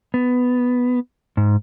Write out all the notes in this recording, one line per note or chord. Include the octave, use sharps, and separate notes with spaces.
B3
G#2